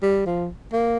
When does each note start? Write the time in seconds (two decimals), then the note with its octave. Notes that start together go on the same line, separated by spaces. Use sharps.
0.02 G3
0.26 F3
0.73 A#3